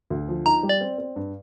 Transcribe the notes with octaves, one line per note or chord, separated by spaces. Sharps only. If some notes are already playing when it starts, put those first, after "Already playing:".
D2
F3
D#4 A#5
G3
D5
C4
C4
G2